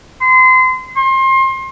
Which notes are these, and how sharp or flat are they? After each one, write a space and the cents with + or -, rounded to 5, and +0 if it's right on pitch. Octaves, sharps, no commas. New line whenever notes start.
C6 -30
C6 +30